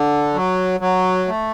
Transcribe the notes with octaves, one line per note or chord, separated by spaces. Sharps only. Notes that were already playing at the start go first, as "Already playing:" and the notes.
Already playing: D3
F#3
F#3
A3